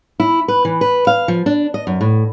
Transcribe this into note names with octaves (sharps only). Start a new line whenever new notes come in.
E4
B4
E3
B4
F5
F3
D4
D#5
F#2
A2